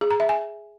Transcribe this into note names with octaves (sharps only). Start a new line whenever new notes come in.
G#4
A#5
E5
G#5